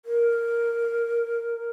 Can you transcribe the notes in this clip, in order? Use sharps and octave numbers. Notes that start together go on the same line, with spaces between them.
A#4